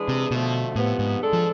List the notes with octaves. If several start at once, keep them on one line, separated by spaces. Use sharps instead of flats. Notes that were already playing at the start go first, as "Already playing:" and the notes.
Already playing: E3 G#3 D4 G#4
C3
B2 D3 F3 A3
A2 C3 F3 B3
G#2
G#3 D4 A4
F3